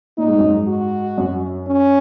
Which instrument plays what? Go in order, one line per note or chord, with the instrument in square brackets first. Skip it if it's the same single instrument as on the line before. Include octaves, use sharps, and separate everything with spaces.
[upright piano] A#2 [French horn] D#4
[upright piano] G#2
F#2
G#2
[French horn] F#4
[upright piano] F#2
[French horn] C#4